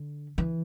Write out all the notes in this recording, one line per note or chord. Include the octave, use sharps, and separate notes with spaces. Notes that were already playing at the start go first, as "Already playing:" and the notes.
Already playing: D3
E3